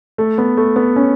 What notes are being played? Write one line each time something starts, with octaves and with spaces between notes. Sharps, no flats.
A3
B3
A3
B3
C#4